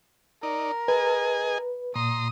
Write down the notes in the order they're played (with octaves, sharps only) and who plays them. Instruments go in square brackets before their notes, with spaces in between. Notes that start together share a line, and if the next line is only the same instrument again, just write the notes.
[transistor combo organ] D#4 D5 [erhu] A#4
[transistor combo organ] G#4 D#5 G#5 [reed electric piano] B4
[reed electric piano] A#2 [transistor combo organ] A#5 C6 [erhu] D#6